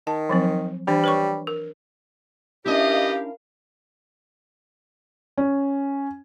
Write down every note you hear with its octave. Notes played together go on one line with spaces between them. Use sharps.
D#3 A5
F3 F#3 C4
E3 G3 D4 C5
B4 C#5 C#6
A#4
E3 C#4 D4 E4 G4 A#4 D#5 F5
C#4